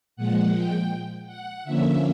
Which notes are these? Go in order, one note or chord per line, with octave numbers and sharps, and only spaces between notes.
A#2 F3 G#3 F#5
G5
F#5
D3 F3 A#3 C#4 E5